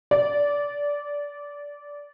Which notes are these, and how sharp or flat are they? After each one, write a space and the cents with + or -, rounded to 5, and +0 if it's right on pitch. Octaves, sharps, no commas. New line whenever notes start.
D5 -15